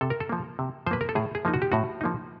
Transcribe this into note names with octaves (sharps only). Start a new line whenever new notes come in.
C3 A4
A#4
A4
F3 A#3
C3
F3 A#3 B4 C5
A#4
A4
A2 G#4
G#4
F3 A#3 D#4
F#4
G4
A2 F#4
F3 A#3 D#4